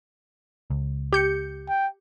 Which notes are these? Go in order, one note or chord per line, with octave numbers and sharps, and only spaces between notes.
C#2
G4 G6 C#7
G5